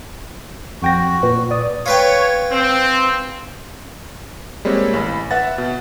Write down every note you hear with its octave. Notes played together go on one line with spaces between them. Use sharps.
F2 F#4 G5 A#6
A#2 B4
D5 D#6
F4 B4 C#5 G5
C4
G3 G#3 A#3 C4 C#5
A1 B5
B4 E5 F#5 A6
B2